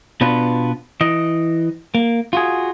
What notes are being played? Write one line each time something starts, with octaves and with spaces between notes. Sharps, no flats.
B2 B3 D4 F4 B4
E3 D#5
A#3
F4 F#4 G#4